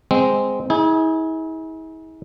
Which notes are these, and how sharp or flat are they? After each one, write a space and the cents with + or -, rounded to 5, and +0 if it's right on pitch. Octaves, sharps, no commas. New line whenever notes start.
G#3 -10 C4 -10
E4 -45 G#4 +0